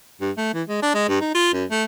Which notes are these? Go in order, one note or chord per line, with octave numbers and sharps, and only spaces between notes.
G2
A3
E3
G#3
D4
G#3
G2
D#4
F4
F#2
A3